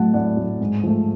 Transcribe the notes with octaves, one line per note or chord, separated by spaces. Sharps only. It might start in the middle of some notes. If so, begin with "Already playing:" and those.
Already playing: A2 F#3 A3 F#5 A5
A2 D5 F#5
F#3 A3
G#2
F3 A3